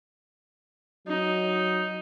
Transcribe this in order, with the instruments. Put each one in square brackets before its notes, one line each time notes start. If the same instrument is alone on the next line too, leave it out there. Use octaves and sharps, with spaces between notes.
[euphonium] F#3 [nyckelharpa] D#4